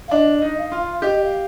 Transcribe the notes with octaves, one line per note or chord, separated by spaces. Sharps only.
F5
D4 D#5
D#4
F5
F4
G4 D#5
F5